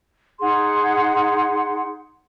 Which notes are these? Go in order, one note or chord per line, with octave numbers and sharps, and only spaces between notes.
D#4 G#4 F#5 C6